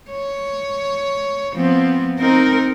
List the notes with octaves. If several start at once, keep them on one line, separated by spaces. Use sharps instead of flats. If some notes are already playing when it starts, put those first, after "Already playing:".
C#5
F3 B3 C4
C4 D#4 A#4